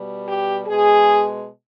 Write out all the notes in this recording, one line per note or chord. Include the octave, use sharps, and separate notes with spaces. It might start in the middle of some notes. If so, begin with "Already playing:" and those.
Already playing: B2 G3
G4
B2 G#3 G#4